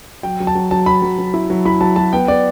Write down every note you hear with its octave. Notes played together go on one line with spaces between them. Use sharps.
F#3 G5
F#3
A5
F#3
F#3 A5
F#3 B5
F#3
F#3
E4
F#3
E4 B5
F#3 A5
F#3 A5
B3 G5
B3 D5